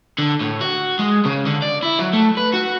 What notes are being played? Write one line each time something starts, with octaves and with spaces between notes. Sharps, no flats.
D3
A2
F#4
G#3
C#3
D3
D5
E4
F#3
A3
B4
F#4